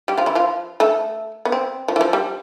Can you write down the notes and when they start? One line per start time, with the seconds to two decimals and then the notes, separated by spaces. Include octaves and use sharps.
0.08 G3 G4
0.18 F3 F4
0.26 E3 E4
0.35 F3 F4
0.80 A3 A4
1.45 B3
1.52 C4
1.88 F3
1.96 E3
2.01 F3
2.13 G3